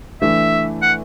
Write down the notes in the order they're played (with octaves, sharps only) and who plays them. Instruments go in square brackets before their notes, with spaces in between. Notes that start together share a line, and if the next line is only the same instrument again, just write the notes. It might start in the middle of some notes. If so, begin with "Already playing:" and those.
[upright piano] E3 A3 D4 [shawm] E5
[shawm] F#5